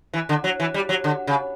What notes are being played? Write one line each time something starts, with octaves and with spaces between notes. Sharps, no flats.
E3
D3
F#3
E3
G3
F#3
D3
C#3